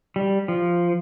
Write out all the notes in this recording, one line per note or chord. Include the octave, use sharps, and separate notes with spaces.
G3
F3